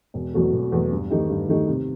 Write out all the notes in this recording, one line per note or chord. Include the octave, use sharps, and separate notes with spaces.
E1
E2 B2 F#3 A3
E1
E2 B2 F#3 A3
G2
D#3 A3 D#4 G4
G2
D#3 A3 D#4 G4
C3